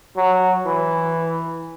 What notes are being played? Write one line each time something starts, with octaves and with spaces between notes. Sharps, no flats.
F#3
E3